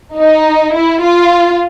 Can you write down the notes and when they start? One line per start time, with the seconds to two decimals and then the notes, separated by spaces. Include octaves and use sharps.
0.17 D#4
0.74 E4
1.02 F4